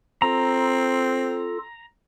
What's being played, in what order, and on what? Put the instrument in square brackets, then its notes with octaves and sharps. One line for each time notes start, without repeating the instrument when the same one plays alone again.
[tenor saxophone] C4 [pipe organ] F4 A4 [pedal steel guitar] A#5